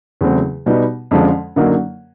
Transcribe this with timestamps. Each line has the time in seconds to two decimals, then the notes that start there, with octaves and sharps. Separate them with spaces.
0.21 E2 C#3 F#3 A3 C4
0.66 B2 G3 B3 D#4 F#4
1.11 F2 D3 F3 G#3 C#4
1.56 F#2 D3 F#3 A#3 D#4